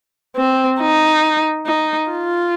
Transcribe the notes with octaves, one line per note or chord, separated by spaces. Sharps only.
C4
D#4
D#4
F4